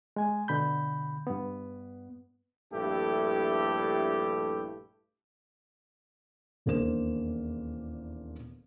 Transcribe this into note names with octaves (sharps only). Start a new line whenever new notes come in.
G#3 G#5
B2 D3 B5 G6
G2 B3
A#1 G2 A3 E4 G4 A4
D#1 E2 A#3 D4 C5 E7